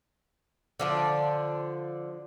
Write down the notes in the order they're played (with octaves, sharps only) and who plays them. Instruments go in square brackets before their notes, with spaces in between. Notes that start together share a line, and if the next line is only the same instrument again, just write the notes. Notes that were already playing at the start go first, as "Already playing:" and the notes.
[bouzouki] D3 F3 D5